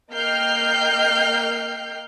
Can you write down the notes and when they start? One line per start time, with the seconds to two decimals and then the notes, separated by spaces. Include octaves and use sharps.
0.12 A#3 D#5 G5 F6 G6 C7